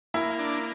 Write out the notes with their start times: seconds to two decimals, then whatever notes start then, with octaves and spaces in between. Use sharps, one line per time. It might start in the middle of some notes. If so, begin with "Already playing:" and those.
0.14 A#3 E4
0.39 D4